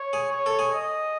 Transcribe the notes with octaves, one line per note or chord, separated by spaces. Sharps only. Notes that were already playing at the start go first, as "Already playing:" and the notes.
Already playing: C#5
G#4
C#5
A4
G#4
D#5